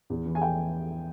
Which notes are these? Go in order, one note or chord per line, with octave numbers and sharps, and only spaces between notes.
E2
E3
G#5
G5